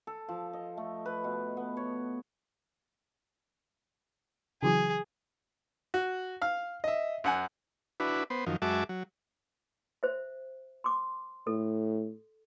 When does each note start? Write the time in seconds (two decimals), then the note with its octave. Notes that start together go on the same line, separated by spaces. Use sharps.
0.07 A4
0.29 F3
0.53 D#5
0.77 A3
1.06 B4
1.24 B2
1.57 B3
1.77 C#5
4.63 C#3 E3 F#3 G#4
5.94 F#4
6.42 F5 F6
6.84 D#5 E5
7.24 F#2 F#5 G#5
8.00 D4 E4 F#4 B4
8.30 B3 C5
8.46 F#2 D#3 F3
8.62 F#2 G#3 F#4 E5 A5 D6
8.89 F#3
10.03 C5 E5
10.84 C6 D6
11.47 A2 A4